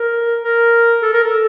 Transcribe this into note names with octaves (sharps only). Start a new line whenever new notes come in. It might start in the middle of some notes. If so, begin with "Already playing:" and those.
Already playing: A#4
A#4
A4
A#4
A4